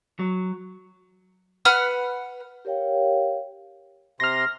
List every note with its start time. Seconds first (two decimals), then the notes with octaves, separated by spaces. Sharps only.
0.19 F#3
1.65 B4 F#5 B5 F6
2.65 G4 A#4 C#5 F5 G5
4.20 C3 C6 F6 A#6